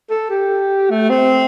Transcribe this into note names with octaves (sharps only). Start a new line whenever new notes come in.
A4
G4
A3
C4